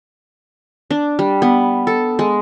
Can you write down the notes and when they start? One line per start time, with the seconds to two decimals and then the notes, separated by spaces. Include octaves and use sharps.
0.90 D4
1.19 G3
1.42 B3
1.87 A4
2.19 G#3